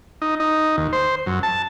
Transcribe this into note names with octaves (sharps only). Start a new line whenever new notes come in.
D#4
D#4
D#2
C5
F#2
A5